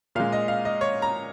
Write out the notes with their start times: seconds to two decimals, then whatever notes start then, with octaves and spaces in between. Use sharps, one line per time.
0.15 A#2 G#3 F5
0.32 D#5
0.48 F5
0.65 D#5
0.81 C#5
1.02 A#5